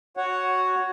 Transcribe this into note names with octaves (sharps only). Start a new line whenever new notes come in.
F#4 C#5 F#5